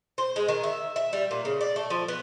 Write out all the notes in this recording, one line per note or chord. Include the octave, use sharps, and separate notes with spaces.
C5
G#3
D#3
E5
E5
G3
A#2
C#3
D5
A3
F3
B3